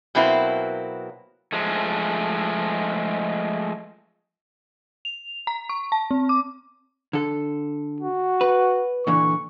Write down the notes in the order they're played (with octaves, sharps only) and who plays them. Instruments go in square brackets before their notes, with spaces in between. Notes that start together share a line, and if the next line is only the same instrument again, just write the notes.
[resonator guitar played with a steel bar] B2 F#3 A#3 C4 E4
[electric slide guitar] F3 G#3 A3
[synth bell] F7
A#5
C#6
A5
C4
D6
[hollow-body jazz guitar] D3 A4
[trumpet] F#4
[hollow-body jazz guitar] B4
[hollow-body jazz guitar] A#2 D3 E3 [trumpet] C#6